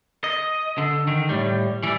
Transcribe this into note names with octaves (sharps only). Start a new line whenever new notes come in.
D#5
D3
D#3
A2 G3
E3 G3